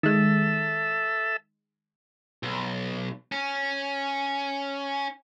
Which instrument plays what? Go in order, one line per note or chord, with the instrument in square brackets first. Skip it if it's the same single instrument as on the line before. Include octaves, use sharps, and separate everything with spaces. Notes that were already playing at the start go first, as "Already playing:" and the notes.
[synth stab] D#3 G#3 [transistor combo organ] A4 E5
[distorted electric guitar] B1
C#4